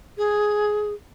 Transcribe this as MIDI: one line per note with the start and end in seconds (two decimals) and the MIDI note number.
0.18 0.93 68